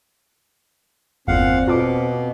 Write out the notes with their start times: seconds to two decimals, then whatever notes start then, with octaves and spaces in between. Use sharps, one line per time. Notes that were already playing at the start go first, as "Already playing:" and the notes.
1.28 G1 E2 A#2 C4 F5 F#5
1.68 B2 F4 A4 D6